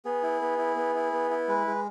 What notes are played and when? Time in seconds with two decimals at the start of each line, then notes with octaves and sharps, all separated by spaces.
0.05 B3 G#4
0.23 E4
0.41 B3
0.58 E4
0.76 B3
0.95 E4
1.12 B3
1.31 E4
1.48 G#3 B4
1.67 G#3